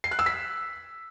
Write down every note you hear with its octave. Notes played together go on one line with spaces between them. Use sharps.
C7
F#6
E6
B6